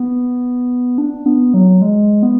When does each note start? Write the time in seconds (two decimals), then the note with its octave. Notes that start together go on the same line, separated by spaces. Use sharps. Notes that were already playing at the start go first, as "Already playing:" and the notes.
Already playing: B3
0.98 D4
1.26 B3
1.54 F#3
1.82 G#3
2.23 B3